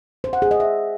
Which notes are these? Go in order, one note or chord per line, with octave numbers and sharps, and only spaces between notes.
C5
F#5
G#4
D#5
E5